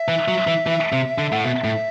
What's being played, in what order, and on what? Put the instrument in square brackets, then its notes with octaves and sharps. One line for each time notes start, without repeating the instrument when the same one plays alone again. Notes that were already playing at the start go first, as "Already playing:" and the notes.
Already playing: [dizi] E5
[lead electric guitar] E3
F#3
E3
E3
C3
D3
[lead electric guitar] A2 [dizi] F#5
[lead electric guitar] B2 [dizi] E5
[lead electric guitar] A2